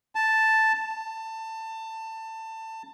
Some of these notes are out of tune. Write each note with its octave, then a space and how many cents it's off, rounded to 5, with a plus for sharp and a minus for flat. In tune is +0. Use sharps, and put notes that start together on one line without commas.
A5 +0
A5 +20